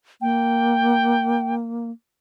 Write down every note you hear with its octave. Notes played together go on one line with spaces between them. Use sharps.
A#3 G5